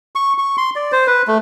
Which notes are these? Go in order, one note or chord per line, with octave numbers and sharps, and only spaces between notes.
C#6
C#6
C6
D5
C5
B4
A3